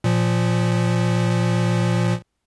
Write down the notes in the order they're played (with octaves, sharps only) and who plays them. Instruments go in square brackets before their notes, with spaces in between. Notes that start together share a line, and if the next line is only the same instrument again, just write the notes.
[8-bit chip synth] A#2 F3